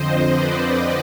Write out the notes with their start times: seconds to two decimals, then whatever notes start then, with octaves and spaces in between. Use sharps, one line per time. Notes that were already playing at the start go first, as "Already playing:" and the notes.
Already playing: F2 D3 F3 C4 C5 D#5
0.30 B4 D5